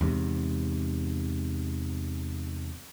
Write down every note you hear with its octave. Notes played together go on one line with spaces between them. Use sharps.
E2 G#2 C3